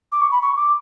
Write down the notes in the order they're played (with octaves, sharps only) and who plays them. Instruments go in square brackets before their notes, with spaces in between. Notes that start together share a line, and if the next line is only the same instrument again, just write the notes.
[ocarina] D6
C#6
B5
C#6
D6